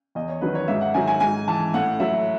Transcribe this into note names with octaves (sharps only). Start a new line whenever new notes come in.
E2 D#5
C#5
D#3 F#3 B4
C#5
G#2 E5
F#5
D#3 F#3 G#5
G#5
G#2 G#5
E3 A5
A2 F#5
F#3 E5